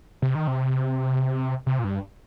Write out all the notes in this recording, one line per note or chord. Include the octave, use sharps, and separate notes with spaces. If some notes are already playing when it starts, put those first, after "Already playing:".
C3
D#3
C3
C3
A#2
G2